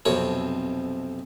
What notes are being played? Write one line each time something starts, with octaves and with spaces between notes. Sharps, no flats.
B1 F2 C3 C#5